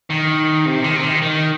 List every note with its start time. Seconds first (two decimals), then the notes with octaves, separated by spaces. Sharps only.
0.10 D#3
0.66 C3
0.85 D#3
0.96 C3
1.04 D#3
1.23 D#3